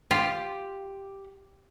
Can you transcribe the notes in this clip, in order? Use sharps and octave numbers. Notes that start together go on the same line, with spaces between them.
F4 G4